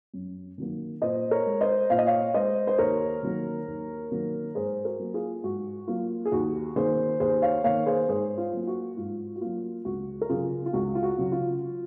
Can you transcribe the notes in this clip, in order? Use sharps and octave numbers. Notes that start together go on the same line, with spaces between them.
F#2
D#3 F#3 A#3
A#2 C5 D#5
A#4 C#5
G#3
C5 D#5
A#2 F5
D#5
C#5 F5
G#3 C5 D#5
C5
D#2 A#4 C#5
D#3 F#3 A#3
D#2
D#3 F#3 A#3
G#2 G#4 C5
F#4 A#4
F#3 A#3
F4 G#4
G#2 F#4
F#3 A#3 F4
G#4
D#2 F#4
D#3 A#3 G#4 C5
D#2 G#4 C5
C#5 F5
D#3 A#3 C#5 F5
G#4 C5
G#2 G#4 C5
F4
F#3 A#3
F4
F#4
G#2 F4
F#4
F#3 A#3 F4
C#2 F#4
A#4
C#3 F#3 F4 G#4
F4
C#2 F#4
F4
F#4
C#3 F#3
F4